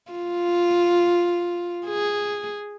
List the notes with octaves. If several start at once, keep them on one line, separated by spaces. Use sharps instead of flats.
F4
G#4